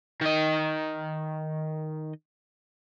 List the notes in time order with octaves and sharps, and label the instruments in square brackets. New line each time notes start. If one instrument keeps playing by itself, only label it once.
[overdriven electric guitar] D#3 D#5